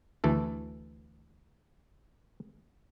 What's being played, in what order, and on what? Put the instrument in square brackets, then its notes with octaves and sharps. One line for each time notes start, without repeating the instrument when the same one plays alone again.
[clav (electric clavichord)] D2 E3 A4